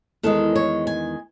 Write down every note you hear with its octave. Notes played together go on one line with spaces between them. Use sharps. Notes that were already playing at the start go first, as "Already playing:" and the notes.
E2 D#3 G#3 A4
C#5
G#5